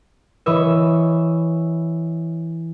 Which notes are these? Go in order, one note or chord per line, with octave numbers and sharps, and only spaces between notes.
E3 B4 C#5 D#5 E5